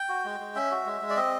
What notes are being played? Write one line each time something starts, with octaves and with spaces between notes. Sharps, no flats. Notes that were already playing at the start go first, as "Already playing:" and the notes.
Already playing: G5
F#4
G#3
G#3
C#4 E5
F#4
G#3
G#3
D5
C4 D#5